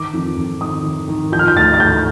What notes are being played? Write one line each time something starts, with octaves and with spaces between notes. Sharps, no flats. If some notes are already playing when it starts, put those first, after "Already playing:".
Already playing: D#3 D6
F2
F2
D#3 D#6
D#3
D#3
F3 G6
F6
G6
D2 A6
A6
D2 G6